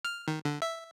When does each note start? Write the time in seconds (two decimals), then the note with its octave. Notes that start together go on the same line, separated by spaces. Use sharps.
0.05 F6
0.28 D#3
0.45 D3
0.62 E5